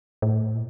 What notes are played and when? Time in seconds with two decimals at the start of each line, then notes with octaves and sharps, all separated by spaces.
0.22 A2
0.55 A#2